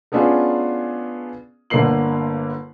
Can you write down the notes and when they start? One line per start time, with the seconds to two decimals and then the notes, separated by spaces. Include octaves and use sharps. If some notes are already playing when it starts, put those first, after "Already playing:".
0.12 A3 B3 C#4 D4 F4 G#4
1.70 G1 D3 A3 A#3 C7 F#7